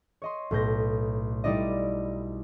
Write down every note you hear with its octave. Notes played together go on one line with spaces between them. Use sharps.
C#5 D#5 C6
B1 A2 B4 G6 A#6
G3 D#4 E4 D5 D#5